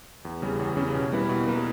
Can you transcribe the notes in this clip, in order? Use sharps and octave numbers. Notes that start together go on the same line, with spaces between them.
E2
C#3 G3 C#4
E2
C#3 G3 C#4
B2
G3 A#3 E4 B4
B2
G3 A#3 E4 B4